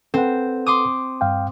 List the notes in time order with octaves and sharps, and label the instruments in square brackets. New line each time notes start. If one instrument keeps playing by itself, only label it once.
[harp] C4 [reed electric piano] A4 B4 F#5
[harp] C6 D6 D#6
[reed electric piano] G2 F5 G5